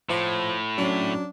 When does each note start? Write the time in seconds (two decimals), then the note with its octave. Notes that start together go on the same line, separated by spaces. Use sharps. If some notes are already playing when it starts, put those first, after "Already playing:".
0.10 A2 F3
0.78 F#3 C#4 D4